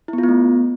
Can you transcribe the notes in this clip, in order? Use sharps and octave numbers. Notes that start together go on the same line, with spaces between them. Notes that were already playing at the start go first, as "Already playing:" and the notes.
E4
B3
F4
B3
A3